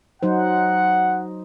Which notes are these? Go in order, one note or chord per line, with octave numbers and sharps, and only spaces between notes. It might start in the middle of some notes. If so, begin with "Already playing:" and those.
F#3 D#4 C5 F#5